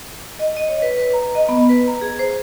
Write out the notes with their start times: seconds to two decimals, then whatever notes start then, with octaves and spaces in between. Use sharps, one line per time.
0.39 D#5
0.57 D#5
0.68 C#5
0.82 B4
0.97 B4
1.13 A#5
1.35 D#5
1.49 B3
1.69 B4
1.87 A#5
2.01 G#4
2.19 C5